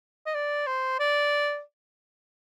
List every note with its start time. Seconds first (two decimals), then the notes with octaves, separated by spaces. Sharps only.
0.26 D#5
0.34 D5
0.67 C5
1.00 D5